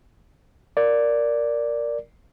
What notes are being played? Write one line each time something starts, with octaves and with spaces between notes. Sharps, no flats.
A#4 D5